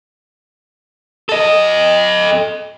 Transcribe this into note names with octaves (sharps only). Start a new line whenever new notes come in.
A4 D#5